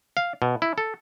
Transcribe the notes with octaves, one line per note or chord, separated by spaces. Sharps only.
F5
B2
E4
A4